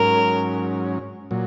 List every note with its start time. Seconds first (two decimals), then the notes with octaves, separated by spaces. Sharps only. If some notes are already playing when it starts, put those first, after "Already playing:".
Already playing: G#2 F#3 C#4 A#4
1.31 A#2 F#3